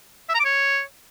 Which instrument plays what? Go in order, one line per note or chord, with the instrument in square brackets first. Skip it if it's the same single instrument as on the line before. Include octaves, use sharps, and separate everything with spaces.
[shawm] E5
A#5
D6
C#5